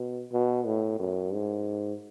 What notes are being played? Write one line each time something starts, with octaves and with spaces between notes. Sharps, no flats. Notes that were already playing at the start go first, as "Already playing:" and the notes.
Already playing: B2
B2
A2
F#2
G#2